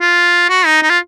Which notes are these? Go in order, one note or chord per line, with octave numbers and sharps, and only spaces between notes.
F4
F#4
D#4
D#4
F4